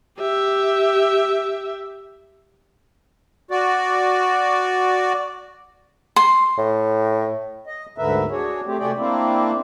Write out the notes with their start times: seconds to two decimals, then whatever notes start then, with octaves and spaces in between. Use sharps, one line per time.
0.18 G4 E5
3.51 F#4 D5
6.16 C6
6.58 A2
7.66 D#5
7.98 D2 G#2 D3 A#4 B4 E5
8.31 D4 F#4 G#4 C#5
8.65 A3 C4 G4
8.79 C3 A3 F#4 G#4 D5 G5
8.98 A#3 C4 D4 E4